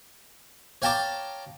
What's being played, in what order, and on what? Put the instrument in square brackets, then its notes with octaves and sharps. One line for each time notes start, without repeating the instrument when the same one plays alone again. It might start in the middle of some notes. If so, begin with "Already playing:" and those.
[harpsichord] C#5 F5 G5 A5 A#5 D6